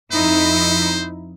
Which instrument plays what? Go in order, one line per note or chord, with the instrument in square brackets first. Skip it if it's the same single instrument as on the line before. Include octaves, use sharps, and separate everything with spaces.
[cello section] F2 D#4 E4 [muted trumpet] C5